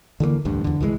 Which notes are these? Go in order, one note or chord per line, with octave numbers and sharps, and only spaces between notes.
D3 E3 G3 A#3
A1 D2 G2
E2 D3
C2 E3 F#3 G#3